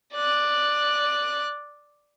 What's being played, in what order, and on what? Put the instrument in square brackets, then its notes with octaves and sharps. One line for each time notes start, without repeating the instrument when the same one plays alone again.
[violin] D5 F#6